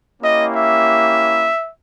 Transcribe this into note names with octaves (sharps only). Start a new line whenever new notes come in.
A#3 C#4 E4 G4 D#5
E5